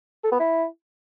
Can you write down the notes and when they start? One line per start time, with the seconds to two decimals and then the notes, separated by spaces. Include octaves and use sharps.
0.24 A4
0.32 B3
0.39 E4